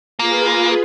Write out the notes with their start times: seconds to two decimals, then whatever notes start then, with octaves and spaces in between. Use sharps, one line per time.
0.19 A#3 F4 G#4 B4